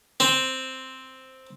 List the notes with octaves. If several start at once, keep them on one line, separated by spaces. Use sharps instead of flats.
C4